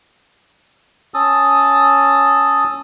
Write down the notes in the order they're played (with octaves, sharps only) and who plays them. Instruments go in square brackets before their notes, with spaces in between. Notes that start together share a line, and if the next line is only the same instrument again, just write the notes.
[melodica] C#4 A5 D#6 E6